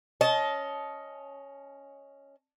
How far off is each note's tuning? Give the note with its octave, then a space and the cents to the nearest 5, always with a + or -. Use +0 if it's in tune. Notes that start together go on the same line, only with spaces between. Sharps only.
C#4 +0 D#5 +10 A5 -25